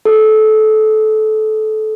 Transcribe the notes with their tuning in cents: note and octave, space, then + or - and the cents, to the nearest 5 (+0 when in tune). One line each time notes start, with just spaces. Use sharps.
A4 -20